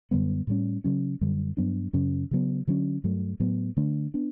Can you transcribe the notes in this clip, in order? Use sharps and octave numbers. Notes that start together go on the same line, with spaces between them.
F#2 D3 G3 B3
A2 G3 C#4
C#3 F#3 C#4
F#2 D3 G3
G2 F#3 B3 D4
F#2 C#3 F#3 C#4
C#3 F#3 B3
D3 F#3 C#4
G2 F#3 A3
A2 F#3 B3
D3 A3 D4
B3 D4